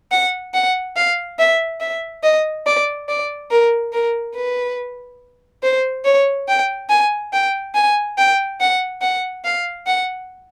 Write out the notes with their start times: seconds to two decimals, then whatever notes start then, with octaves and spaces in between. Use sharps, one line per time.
0.12 F#5
0.54 F#5
0.96 F5
1.39 E5
1.80 E5
2.23 D#5
2.67 D5
3.09 D5
3.51 A#4
3.93 A#4
4.35 B4
5.63 C5
6.05 C#5
6.48 G5
6.90 G#5
7.33 G5
7.75 G#5
8.18 G5
8.60 F#5
9.02 F#5
9.45 F5
9.87 F#5